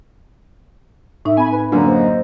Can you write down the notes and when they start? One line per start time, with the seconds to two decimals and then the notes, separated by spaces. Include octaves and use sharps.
1.25 A2 D#4 E5
1.37 C4 G#5 B5
1.51 B4
1.72 F#2 D3 A#3
1.85 C5 D#5